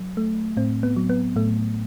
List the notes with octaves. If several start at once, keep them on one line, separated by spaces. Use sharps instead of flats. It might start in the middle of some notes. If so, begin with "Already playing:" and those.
Already playing: F#3
A3
A2 C4
B3
F#3
B3
A2 A3